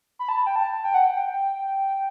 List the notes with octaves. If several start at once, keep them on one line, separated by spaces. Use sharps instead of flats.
B5
A5
G5
A5
G5
F#5
G5